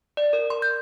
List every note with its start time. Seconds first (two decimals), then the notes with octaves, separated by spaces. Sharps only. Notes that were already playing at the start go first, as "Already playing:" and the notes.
0.17 D5
0.33 A#4
0.50 C6
0.62 G6